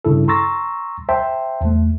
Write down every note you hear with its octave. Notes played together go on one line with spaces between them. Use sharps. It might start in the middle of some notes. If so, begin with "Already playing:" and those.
G2 C#3 E4 A4
A#5 C6 C#6 E6 A6 A#6
C5 E5 G5 A5 C6
E2 A3